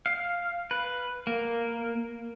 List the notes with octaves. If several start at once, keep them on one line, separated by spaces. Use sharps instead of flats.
F5
B4
A#3